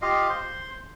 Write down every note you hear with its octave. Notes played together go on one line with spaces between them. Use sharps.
F4 G4 D#5 F5
C5 C6